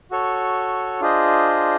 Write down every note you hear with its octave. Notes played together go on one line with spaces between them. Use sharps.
F#4 A4 C#5
D4 F4 G#4 C5 D#5